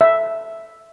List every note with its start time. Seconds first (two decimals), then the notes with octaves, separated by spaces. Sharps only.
0.01 E5